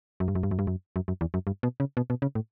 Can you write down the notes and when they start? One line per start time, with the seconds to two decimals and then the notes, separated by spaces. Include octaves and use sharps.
0.20 F#2
0.28 G2
0.35 F#2
0.43 G2
0.51 F#2
0.59 G2
0.67 F#2
0.96 F#2
1.08 F#2
1.21 E2
1.34 F#2
1.47 G2
1.63 B2
1.80 C#3
1.97 B2
2.10 B2
2.22 C#3
2.35 A2